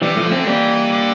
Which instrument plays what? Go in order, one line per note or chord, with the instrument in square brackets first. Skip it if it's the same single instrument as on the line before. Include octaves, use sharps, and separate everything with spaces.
[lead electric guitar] C3 [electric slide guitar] E3 G3
[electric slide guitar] F3 A3
[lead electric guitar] D3
[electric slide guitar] A3 C4
[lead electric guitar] E3 [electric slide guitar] G3 A#3
[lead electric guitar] D3